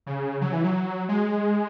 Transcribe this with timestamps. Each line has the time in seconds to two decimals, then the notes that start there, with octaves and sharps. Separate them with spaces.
0.07 C#3
0.41 F#3
0.52 E3
0.64 F#3
1.09 G#3